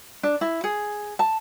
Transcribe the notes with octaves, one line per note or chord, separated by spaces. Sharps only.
D4
E4
G#4
A5